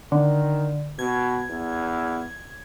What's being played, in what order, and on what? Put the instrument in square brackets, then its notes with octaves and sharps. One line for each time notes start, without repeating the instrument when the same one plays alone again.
[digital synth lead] D3 [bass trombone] D#3
[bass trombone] B2 [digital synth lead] G#6
[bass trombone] E2